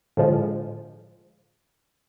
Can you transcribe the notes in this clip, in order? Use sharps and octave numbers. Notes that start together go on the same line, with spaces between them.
A2 D3 F3 G#3